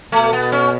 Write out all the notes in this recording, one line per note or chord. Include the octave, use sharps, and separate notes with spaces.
B2 A3
B3
C#4